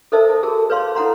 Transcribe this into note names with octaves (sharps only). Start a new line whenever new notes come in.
A4 A#4 C5 D#5 E5 A5
A5
F#4 G#4 A#4 A5
B4 C#5 F5 C6
E4 A4 F#5 A#5 C6